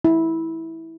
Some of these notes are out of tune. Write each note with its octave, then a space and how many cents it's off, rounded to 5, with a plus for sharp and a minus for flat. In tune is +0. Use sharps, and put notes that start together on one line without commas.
E4 -15